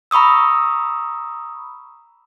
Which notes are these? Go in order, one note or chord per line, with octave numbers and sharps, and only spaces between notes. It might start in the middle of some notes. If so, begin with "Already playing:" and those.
A#5 B5 C#6 D#6 E6